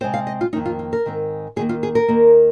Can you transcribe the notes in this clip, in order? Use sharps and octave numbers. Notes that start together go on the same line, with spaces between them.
C3 G#3 C4 C5
F5
D#5
F4
F2 D#3 A#3 D#4
F4
F4
A#4
G#2 D#3 G#3 C4
D#2 D#3 A#3 G#4
F4
G#4
A#4
D#2 D#3 A#3